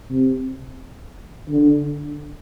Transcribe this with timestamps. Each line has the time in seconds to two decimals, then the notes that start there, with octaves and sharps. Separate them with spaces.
0.10 C3
1.48 D3